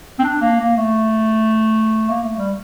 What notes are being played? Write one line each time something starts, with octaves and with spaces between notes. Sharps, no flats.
C4
D4
A#3
A#3
A3
A#3
A3
G3